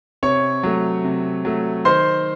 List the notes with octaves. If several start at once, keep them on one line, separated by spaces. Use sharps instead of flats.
C3 C#5 C#6
F#3 A3
C3
F#3 A3
D#3 C5 C6